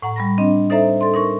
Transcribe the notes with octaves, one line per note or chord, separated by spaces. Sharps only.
A2 F#5 A#5
G3 B5 A#6
C4 D4 D#5
D#4 A4 C5 D5 E5 A#5
A4 D5 C6
D#4 A#4 C#6